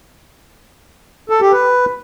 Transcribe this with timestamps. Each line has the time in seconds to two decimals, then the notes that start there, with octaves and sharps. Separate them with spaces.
1.30 A4
1.41 G4
1.52 B4